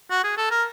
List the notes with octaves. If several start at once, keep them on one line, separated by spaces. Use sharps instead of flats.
F#4
G#4
A4
A#4